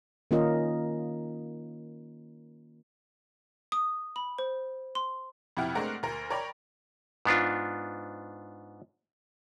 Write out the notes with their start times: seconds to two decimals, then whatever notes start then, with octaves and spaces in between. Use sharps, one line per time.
0.31 D#3 A#3 C#4 F4 A#4 D#5
3.72 D#6
4.16 B5
4.38 C5
4.95 C6
5.57 F2 C3 E4 F#5 G5 F6
5.75 G#3 A3 C4 D4 A#4 F#5
6.03 D2 A#4
6.30 A#4 C#5 D5 G5 A#5 B5
7.25 G#2 B3 D4 F4